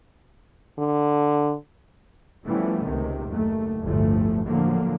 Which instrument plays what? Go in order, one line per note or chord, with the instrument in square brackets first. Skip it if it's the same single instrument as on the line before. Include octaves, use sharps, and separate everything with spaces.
[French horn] D3
[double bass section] E3 F3 G3 A3 B3 C#4
C#2 C3 D#3
F#1 D#2 A3
G1 D2 A2 F3 A3
A2 D3 F3 F#3 A#3